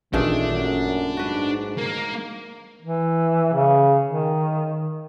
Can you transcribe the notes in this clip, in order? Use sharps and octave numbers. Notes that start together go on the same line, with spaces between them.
A1 A#2 D#3 A3 D4 G#4
F#2
G#2 F#4 B4
A#3
E3
C#3
D#3